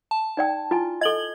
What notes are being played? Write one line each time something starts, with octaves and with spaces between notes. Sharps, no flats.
A5
D#4 D5 G5
E4 F4 G#5
A4 D#5 G#6 F#7 G7